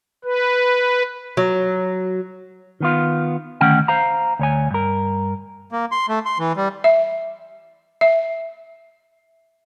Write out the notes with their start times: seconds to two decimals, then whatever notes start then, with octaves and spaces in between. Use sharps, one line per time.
0.24 B4
1.37 F#3
2.80 D#3 B3 F4
3.61 D2 D#3 A3 C#4 F#5 G5
3.88 C5 F5 A#5
4.39 D2 C#5 G#5
4.71 G2 A#4
5.72 A#3
5.92 C6
6.09 A3
6.25 C6
6.39 E3
6.57 G3
6.84 E5
8.01 E5